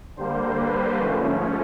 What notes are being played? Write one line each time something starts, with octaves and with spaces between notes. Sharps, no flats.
D3 G3 A#3 C5
B4
G#2 F3 A3 C#4